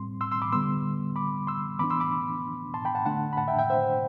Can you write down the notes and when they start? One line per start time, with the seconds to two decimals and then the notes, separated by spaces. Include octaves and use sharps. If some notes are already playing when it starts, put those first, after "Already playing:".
Already playing: A2 G3 C4 C6
0.21 C6 E6
0.32 C6 E6
0.42 B5 D6
0.52 D3 G3 B3 C6 E6
1.16 B5 D6
1.47 C6 E6
1.79 E3 B3 D4 B5 D6
1.90 C6 E6
2.00 B5 D6
2.74 A5 C6
2.85 G5 B5
2.95 F#5 A5
3.06 D3 A3 D4 F#5 A5
3.33 B5
3.37 F#5 A5
3.48 E5 G5
3.59 E5 G5
3.70 C5 E5